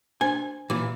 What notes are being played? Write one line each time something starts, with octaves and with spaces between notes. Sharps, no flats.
D4 C5 G#5
A#2 E3 D6